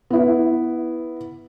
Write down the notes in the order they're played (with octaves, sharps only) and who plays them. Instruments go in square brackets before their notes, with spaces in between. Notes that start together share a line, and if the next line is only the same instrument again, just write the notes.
[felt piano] B3 E4